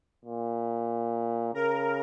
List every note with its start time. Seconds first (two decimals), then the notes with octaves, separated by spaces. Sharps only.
0.25 A#2
1.54 C#3 A#4